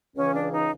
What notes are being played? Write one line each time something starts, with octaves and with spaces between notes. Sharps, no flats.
C#2 C#3 E3 C#4
D4
D#4